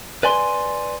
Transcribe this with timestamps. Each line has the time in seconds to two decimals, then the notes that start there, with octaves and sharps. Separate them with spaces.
0.23 B4 D5 G#5 C6